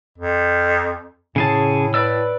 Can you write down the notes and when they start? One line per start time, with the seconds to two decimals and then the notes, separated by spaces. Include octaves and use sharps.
0.18 F2
1.36 A2 C#3 G#4 A5
1.94 B4 D5 E6